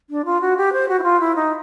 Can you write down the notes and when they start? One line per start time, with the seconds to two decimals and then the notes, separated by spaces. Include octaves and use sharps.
0.10 D4
0.25 F4
0.41 F#4
0.57 G4
0.73 C5
0.89 F#4
0.99 E4
1.04 F4
1.20 E4
1.36 D#4